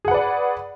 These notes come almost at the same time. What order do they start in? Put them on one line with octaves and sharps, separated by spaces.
G#4 F#5 B4 D5